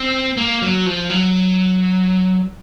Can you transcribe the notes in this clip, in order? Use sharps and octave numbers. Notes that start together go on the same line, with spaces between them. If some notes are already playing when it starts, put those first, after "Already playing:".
Already playing: C4
A#3
F#3
F3
F#3